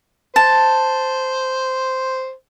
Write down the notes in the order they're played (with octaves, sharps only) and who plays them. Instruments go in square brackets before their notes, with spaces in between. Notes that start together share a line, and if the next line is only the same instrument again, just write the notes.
[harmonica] C5 [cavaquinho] A5